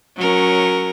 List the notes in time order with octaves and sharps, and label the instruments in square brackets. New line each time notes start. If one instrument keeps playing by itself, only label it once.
[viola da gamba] F#3 C#4 A#4